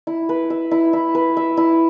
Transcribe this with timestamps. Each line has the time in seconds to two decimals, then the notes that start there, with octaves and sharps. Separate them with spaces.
0.07 E4
0.29 B4
0.50 E5
0.71 E4
0.93 E4
1.15 B4
1.37 E5
1.57 E4